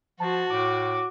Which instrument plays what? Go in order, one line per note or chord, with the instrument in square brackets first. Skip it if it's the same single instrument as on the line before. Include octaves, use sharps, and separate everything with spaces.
[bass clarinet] F3 [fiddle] F#4 [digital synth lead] A5
[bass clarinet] A2 [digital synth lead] D6